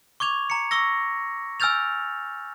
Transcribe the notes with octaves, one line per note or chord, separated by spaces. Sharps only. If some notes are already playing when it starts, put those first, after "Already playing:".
C#6 D6 G#6 F7
A#5 C#7
C#6 E6 A#6
G#5 E6 F6 G6 A6 F7